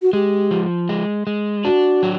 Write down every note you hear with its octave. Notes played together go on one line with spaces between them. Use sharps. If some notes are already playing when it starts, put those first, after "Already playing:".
F#4
G#3 G4
F3
G#3
G#3
D4 F#4
F#3